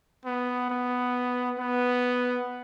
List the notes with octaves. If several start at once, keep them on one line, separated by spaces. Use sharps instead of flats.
B3
B3
B3